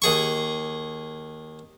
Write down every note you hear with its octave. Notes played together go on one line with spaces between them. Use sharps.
D#2 G#4 C#6